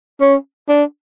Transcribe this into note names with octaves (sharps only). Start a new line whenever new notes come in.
C#4
D4